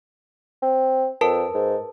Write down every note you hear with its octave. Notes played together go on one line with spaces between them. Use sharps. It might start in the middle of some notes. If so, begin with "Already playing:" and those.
C4
F2 A#4 B4 A5
G#2